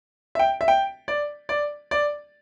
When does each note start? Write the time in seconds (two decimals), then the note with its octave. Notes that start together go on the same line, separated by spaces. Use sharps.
0.35 E5
0.39 G5
0.61 E5
0.68 G5
1.08 D5
1.49 D5
1.91 D5